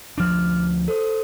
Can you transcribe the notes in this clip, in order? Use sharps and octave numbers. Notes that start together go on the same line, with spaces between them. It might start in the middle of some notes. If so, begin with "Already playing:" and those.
D2 F3 D4 D6 F6
A4 C5 D#6